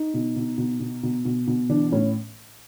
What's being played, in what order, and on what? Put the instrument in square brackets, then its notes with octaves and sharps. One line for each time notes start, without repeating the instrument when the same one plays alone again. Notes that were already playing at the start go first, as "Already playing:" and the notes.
Already playing: [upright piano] D#4
B2
B2
B2
B2
B2
B2
B2
E3 D4
A2 C#4